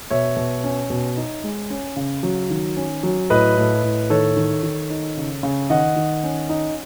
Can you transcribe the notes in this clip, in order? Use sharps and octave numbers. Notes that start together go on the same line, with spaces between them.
B2 C#5 E5
B2
C#4
B2
D#4
G#3
C#4
C#3
F#3
D#3
C#4
F#3
A2 B4 D#5
A2
A2
D#3 A4 C#5
D#3
D#3
D#4
C#3
C#3
D#3 D#5 F#5
D#3
C#4
D#4